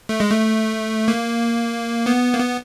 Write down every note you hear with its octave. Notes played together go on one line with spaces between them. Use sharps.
A3
G#3
A3
A#3
B3
A#3
B3